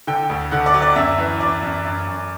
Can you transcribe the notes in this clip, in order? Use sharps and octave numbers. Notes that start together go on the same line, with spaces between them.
D3 G5
D2
D3 F#5
D5
F#3
D5
F#2 E5
E3
F#2 D5
F#2
F#2
F#2